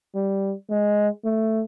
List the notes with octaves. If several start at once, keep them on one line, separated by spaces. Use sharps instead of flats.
G3
G#3
A3